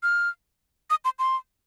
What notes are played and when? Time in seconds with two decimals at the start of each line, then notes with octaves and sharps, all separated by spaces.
0.03 F6
0.90 D#6
1.05 C6
1.19 C6